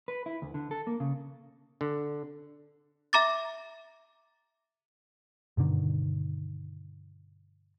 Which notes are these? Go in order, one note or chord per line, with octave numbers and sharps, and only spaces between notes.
B4
E4
D2
D3
A4
A#3
C#3
D3
E5 A#5 D6 A6
G2 B2 D3 D#3